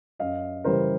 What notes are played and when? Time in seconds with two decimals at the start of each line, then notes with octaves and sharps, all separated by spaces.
0.19 F#2 D#5 F5
0.64 C#3 E3 G3 A#4 C5